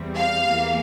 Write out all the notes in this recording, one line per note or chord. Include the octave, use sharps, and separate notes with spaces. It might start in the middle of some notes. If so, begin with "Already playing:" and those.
Already playing: E2 E3 G3 C4
F5
E2 E3 A#3